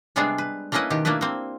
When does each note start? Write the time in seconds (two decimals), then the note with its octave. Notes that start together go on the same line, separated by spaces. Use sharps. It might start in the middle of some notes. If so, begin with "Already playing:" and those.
0.16 C3 G3 G#3 B3 D4 G#4
0.38 B4
0.72 A3 A#3 C#4 E4 B4 D#5
0.90 B2 D#3 G4
1.05 A3 A#3 D4 E4 B4
1.21 A#3 C4